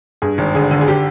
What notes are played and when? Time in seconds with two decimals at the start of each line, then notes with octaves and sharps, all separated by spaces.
0.22 G2 G#4
0.38 G#1
0.55 D3 G#4
0.71 D3
0.81 G#4
0.88 G4